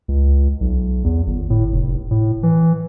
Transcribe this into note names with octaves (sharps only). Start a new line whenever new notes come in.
C#2
B1
E2
G1
A2
F1
A2
E3